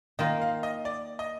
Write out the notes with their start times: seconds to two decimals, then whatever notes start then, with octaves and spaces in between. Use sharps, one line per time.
0.19 D#3 A#3 F4 D#5
0.42 F5
0.63 D#5
0.85 D5
1.19 D#5